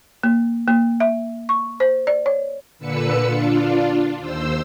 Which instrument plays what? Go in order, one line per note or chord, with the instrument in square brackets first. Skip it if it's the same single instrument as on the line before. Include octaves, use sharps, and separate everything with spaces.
[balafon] A#3
A#3
E5
C#6
C5
D5
C#5
[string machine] A#2 D3 B4 E6 C#7
D4 F4
D#2 C5 E6